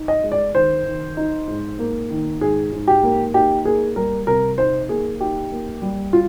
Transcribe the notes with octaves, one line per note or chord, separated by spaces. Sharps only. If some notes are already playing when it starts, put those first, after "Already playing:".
Already playing: D#4
D#5
G#3
D5
D#3 C5
D#3
D#4
G#2
A#3
D#3
G#2 G#4
G#2
G4
A#3
D#4 G4
A#3 G#4
G3 A#4
C3 A#4
D#4 C5
A#3 G#4
D#4 G4
A#3
G3
F4